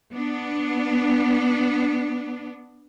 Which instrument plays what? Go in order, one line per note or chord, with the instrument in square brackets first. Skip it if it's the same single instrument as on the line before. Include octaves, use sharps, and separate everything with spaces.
[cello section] B3 D4